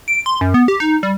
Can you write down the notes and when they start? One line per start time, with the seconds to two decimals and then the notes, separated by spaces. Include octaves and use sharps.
0.08 D7
0.26 C6
0.41 F#2
0.54 B3
0.68 G4
0.80 D#4
1.03 G3